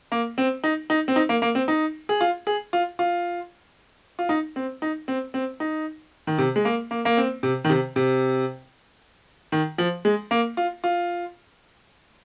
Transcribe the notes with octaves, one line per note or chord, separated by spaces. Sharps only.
A#3
C4
D#4
D#4
C4
D#4
A#3
A#3
C4
D#4
G#4
F4
G#4
F4
F4
F4
D#4
C4
D#4
C4
C4
D#4
D#3
C3
G#3
A#3
A#3
A#3
C4
C3
D#3
C3
C3
D#3
F3
G#3
A#3
F4
F4